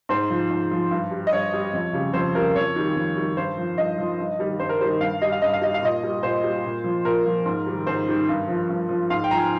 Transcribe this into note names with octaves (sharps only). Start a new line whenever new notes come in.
G#2 C5
F3
G#2
F3
G2
G3
D#5
G2 C#5
G3
F2
C#3 G3
F2 C5
C#3 G3 A#4
F2 C#5
D#3 G3
F2
D#3 G3
G2 C5
F3
G2 D#5
F3
G2
D#3 G3
G2 C5
A#4
D#3 G3 C5
G2 F5
G3 D#5
F5
G2 D#5
F5
G3 D#5
F5
A#2 D#5
G3
A#2 C5
G3
A#2
F3
A#2 A#4
F3
G#2
D#3 G3
G#2 C5
D#3 G3
G2
F3
G2
F3
G#2 F5
G5
F3 A#5
G#5